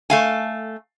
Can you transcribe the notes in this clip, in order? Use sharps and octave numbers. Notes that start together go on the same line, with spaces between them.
A3 F5 G#5